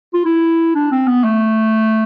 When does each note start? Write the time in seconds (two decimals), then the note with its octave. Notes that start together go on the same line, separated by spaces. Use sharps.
0.14 F4
0.25 E4
0.75 D4
0.91 C4
1.07 B3
1.24 A3